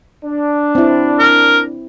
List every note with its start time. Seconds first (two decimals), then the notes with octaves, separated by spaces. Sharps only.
0.25 D4
0.75 C4 E4
1.19 A#4